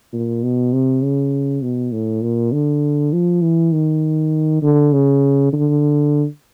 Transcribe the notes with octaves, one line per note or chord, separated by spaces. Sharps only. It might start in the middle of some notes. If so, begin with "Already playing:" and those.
A#2
B2
C3
C#3
B2
A2
A#2
D3
F3
E3
D#3
D3
C#3
D3